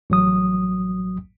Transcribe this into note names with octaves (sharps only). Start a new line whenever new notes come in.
A1 F#3 D#6